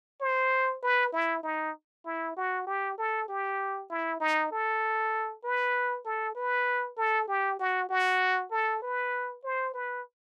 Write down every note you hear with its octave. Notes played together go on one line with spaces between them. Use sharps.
C5
B4
E4
D#4
E4
F#4
G4
A4
G4
E4
D#4
A4
B4
A4
B4
A4
G4
F#4
F#4
A4
B4
C5
B4